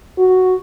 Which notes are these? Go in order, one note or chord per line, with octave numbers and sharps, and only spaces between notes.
F#4